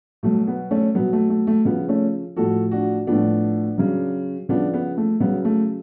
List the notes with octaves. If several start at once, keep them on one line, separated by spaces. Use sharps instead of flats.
B2 F#3 A3
B3
A3 C#4
B2 F#3 B3
A3
A3
A3
C#3 F3 B3
A3 C#4
A2 F3 F#4 A4
D4 F#4
A2 F3 B3 D4
C#3 F#3
C#3 F3 B3 D4
B3
A3
C#3 F#3 B3
A3